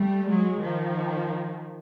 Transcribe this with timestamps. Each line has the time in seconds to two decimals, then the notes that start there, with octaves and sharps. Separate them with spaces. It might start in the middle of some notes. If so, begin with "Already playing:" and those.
Already playing: G3 A3
0.26 F#3 G#3
0.60 D#3 F3